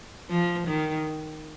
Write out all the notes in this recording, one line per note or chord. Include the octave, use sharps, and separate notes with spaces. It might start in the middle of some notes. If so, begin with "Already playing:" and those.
F3
D#3